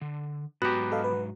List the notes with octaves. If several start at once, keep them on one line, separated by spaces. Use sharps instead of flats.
D3
G#2 F#3 B3 F#4 G4 A#5
A4 D#5 F5
B4